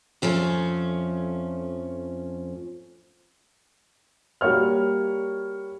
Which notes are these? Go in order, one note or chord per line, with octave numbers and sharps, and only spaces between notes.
F2 F3 A3 C#4
G3 A#3 F#4 C#5 F6